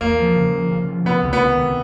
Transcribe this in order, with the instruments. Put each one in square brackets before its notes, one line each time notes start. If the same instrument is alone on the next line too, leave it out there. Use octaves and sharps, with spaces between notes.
[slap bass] E2 [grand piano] A#3
[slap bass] F3
C#3
F3
C#3
F3
[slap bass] C3 [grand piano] B3
[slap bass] C#2
[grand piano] B3
[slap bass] D#3
C3